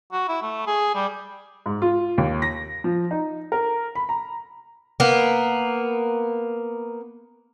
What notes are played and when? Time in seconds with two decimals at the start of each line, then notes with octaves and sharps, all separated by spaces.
0.12 F#4
0.28 E4
0.42 A3
0.67 G#4
0.95 G3
1.66 G#2
1.82 F4
2.18 D#2
2.42 A#6
2.84 F3
3.11 D#4
3.52 A#4
3.95 B5
4.09 A#5
5.00 A#3 B3